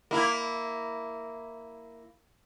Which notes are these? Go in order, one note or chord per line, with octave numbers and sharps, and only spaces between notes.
A#3 E4